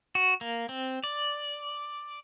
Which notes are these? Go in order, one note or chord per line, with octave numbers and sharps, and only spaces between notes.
F#4
A#3
C4
D5